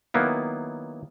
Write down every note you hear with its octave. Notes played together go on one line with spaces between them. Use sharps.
D#3 F#3 A#3 B3 E4